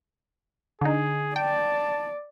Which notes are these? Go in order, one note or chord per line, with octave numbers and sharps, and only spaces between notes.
D3 D#4 G#4
D5 G5 A5